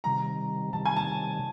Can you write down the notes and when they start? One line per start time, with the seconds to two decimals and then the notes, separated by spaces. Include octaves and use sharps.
0.04 C3 D#3 G3 A#5
0.73 C3 D#3 G3 A5
0.85 G#5
0.96 A5